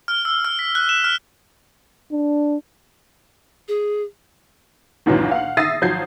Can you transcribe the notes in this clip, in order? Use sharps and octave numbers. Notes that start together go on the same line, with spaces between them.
F6
E6
F6
B6
F#6
E7
F6
D4
G#4
G1 C#2 A#2 D#3 E3 F#3
F5 F#5
E5 D#6 A6 A#6 C7 D#7
G#1 F3 F#3 G6 G#6 C7